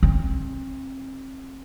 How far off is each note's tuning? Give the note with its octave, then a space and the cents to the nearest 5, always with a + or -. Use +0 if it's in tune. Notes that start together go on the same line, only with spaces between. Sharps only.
C4 +35